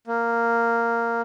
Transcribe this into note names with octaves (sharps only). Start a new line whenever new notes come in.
A#3